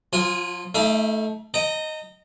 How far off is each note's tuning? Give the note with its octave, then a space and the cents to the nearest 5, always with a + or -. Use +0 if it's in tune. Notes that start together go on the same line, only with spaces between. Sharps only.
F3 +45 F4 +0 G#5 -10
A3 -10 D#4 +35 E5 +45
D#5 +0 G5 -25 A#5 -35